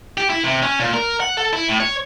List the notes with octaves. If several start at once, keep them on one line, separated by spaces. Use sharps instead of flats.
G4
E4
C3
C#4
A#2
A#4
F#5
A4
E4
A2
C#5